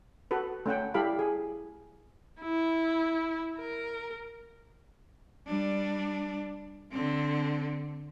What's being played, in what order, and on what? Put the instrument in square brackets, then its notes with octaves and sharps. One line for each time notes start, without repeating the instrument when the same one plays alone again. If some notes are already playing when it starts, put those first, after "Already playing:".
[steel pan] F#4 A4 B4
A3 C#4 F#5 G5
G3 E4 G4 A4 F5 B5
G#4
[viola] E4
A#4
[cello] G3 D4
D3 C4